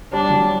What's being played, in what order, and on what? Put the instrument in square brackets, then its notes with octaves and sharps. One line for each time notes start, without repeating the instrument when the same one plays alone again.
[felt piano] G3 [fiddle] D4
[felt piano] F#3